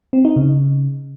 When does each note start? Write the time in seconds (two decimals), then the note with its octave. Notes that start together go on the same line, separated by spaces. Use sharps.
0.13 C4
0.25 D#4
0.36 C#3